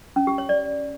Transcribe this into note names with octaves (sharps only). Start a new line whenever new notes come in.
C#4
G4
C#5
D5